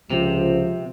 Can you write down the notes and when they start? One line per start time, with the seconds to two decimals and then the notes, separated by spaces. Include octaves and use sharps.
0.10 C#2 C3 F3